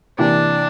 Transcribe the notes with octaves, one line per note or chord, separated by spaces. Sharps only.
C3 E3 A#3 D4